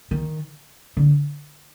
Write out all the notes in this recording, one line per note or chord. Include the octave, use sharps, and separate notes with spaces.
D#3
D3